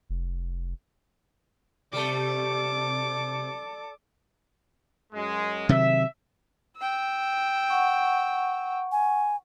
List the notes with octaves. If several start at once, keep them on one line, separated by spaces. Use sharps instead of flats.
F1
C3 G3 A3 A4 D5 D6
F#2 G#3
C3 D#3 F#3 E5
G5 E6
F#5 C#6
G#5